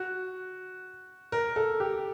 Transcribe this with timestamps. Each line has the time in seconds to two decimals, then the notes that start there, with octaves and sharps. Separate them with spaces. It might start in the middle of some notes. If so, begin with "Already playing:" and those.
Already playing: F#4
1.32 A#4
1.56 A4
1.80 G4